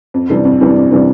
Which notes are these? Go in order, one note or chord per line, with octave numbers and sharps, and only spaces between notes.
F2
C3 E3 G3 D4
F2
C3 E3 G3 D4
F2
C3 E3 G3 D4